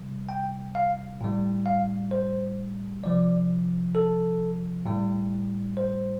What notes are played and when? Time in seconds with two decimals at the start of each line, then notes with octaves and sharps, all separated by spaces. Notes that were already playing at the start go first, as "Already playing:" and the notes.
Already playing: C3 G3
0.29 G5
0.75 F5
1.21 A2 G3
1.66 F5
2.11 C5
3.03 C3 F3 D5
3.95 A4
4.86 A2 G3
5.77 C5